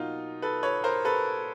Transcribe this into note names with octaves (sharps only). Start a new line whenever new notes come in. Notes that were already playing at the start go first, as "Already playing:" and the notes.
Already playing: B2 F#3 A#3 D#4 F4
A4 B4
B4 C#5
A#4 C5
A4 B4